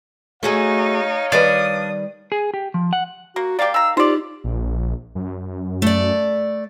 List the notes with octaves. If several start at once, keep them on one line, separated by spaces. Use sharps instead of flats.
A3 D#4 F#4 G#4 C#5 F5
D#3 G3 D4 B4 D#6
G#4
G4
F3
F#5
A#3 F#4
A#3 G4 D5 F5
D#3 A#5 E6
D#4 F4 G4 C5 D5
A#1
F#2
A3 D5